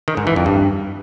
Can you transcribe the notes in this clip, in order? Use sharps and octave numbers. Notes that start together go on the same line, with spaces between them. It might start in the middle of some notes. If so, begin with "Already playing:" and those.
D#3
G#2
E3
F2
G2